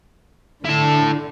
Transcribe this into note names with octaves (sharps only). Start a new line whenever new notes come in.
D3 E4 A5